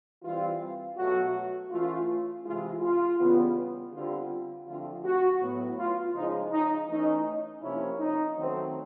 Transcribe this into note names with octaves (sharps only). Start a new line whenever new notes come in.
E3 G3 C4 F4
B2 F#3 A3 F#4
E3 A3 C#4 F4
C3 E3 G#3 F4
F4
C#3 E3 G3 B3
D3 G3 C4 F4
D3 F3 A3 C4 F4
F#4
A2 F#3 B3
F4
C#3 F3 G#3 C#4 D#4
D#4
E3 A3 C#4 D#4
C3 F3 A#3 C#4 E4
D#4
D#3 F#3 A3 C4